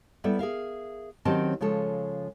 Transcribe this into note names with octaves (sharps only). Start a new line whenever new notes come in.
G3 B3 E4 A4 B4 E5
G#4 A#4 E5 F5
D#3 F#3 C4 C#4 G4 A5
C#3 F3 G#3 A4 C#5